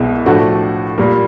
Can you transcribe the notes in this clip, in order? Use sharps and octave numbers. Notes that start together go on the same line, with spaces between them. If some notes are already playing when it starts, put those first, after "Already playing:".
Already playing: C2 B2 G#3 B3 E4
A2 F3 A3 D4 F#4
A#2 G3 A#3